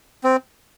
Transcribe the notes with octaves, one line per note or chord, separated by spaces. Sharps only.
C4